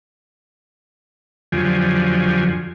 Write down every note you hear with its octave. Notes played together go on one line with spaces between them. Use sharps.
F2 D3 F3 F#3 G4 G#5